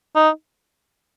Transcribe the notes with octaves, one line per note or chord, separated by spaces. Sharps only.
D#4